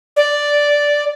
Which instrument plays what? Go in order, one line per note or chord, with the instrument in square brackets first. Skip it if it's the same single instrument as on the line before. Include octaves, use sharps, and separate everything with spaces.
[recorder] D5